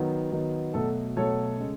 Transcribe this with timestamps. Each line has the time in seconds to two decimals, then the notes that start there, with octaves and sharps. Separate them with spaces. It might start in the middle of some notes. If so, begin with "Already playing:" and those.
Already playing: D#3 F#3 B3
0.32 D#3 F#3 B3
0.74 B2 F#3 A3 A4
1.17 B2 F#3 A3 A4 C#5
1.58 C#3 G#3